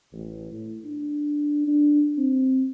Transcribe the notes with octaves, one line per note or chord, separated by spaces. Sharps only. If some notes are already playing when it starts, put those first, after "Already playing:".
A1
A2
D4
D4
C4